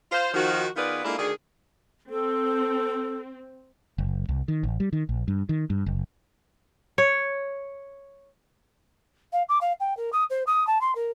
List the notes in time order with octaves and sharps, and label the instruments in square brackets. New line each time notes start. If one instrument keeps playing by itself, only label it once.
[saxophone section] F4 C5
D#3 F3 F#4
D#3 B3 F4 G#4 B4 D5
G#3 A#3 D4 E4 F4 A4
D2 D#3 D4 G#4
[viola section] C4 [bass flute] A4
[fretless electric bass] F#1
C2
D#3
A1
G3
D#3
A#1
G2
D#3
G2
F#1
[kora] C#5
[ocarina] F5
D6
F5
G5
A#4
D#6
C5
D#6
A5
C6
A#4